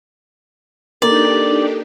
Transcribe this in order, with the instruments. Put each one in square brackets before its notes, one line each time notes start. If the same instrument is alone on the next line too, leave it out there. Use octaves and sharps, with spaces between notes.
[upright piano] A#3 [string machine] D4 D#4 G4 [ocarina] A4 [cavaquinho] D5